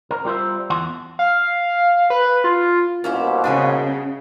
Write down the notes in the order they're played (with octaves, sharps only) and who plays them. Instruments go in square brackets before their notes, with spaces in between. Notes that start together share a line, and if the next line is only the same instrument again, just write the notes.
[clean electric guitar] A#4
G3 F4 C5 E5
E2 F#5 C6
[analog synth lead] F5
B4
F4
[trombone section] C2 B2 [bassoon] A#3 [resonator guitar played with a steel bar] C#4 E4 G4
[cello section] C#3 [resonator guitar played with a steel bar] D4 B4 G#5